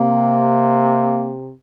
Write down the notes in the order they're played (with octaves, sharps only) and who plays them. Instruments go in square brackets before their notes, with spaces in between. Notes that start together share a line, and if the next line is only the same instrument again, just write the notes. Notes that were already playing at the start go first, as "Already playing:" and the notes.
Already playing: [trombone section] C3 [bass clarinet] A#3